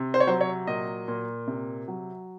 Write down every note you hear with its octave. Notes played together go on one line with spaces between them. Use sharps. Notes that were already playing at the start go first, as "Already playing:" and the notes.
Already playing: C3
C5
C#5
F#3 C5
C#5
A#2 D#5
A#2
C3
F#3